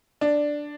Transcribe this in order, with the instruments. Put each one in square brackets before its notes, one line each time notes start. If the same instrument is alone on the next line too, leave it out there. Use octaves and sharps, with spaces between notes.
[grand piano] D4